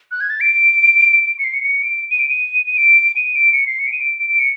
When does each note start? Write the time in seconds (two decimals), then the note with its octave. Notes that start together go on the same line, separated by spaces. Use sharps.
0.11 F#6
0.21 G#6
0.30 A6
0.41 D7
1.26 D7
1.39 C#7
1.44 C7
1.53 C#7
1.64 C#7
1.83 D7
2.11 D#7
2.19 D7
2.28 D#7
2.66 D#7
2.78 D7
3.16 D#7
3.35 D7
3.53 C#7
3.66 C7
3.79 C#7
3.87 D7
3.92 D#7
4.01 D7
4.19 D7
4.30 D7
4.39 C#7